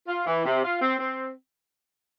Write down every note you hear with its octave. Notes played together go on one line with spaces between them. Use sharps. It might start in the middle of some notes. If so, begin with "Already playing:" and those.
F4
E3
C3
F4
C4
C4